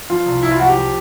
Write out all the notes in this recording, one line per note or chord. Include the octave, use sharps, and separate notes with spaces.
F3 F4
C2
C2 E4
F4
F3 F#4
G4
F3